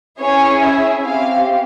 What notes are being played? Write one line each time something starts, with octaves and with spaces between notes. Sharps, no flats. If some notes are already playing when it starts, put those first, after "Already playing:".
C#4 E4 G#4 C#5
E5
C4 G4 F5